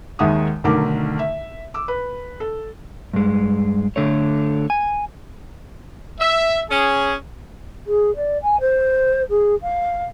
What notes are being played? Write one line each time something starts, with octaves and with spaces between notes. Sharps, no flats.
D#2 D#3 G#3 E5 F#5 D#6
B1 D3 D#3 A3 A#4 D6
E5
D6 E6
B4
A4
G2 G#3
D3 A3 C#5
G#5
E5
C#4 G#4
G#4
D5
G#5
C5
G#4
F5